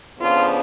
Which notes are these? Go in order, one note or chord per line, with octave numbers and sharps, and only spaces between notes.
F2 C#3 F3 B3 D4 F4